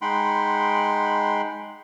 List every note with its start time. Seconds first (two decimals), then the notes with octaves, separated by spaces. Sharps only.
0.02 G#3 D#4 F#5 G5 B5 C6